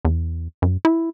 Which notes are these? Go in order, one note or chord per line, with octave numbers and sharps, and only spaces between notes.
E2
F#2
E4